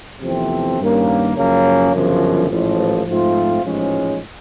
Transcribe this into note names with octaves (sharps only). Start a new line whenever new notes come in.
E2 C3 F3 A3 C4
G2 D#3 G3 A#3 C#4
F#2 C#3 F3 A#3 C#4
G1 F#2 C#3 F3
A1 G#2 F3
G#2 F3 A3 C4 F4
A1 G#2 F3 G#3 C#4